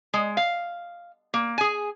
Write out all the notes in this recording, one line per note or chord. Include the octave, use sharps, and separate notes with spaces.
G#3
F5
A#3
G#4 G#5